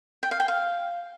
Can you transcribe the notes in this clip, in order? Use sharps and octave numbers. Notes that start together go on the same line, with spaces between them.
G5
F5
G5
F5